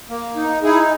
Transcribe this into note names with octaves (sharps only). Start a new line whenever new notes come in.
A#3
D#4
D#4 E4 G#4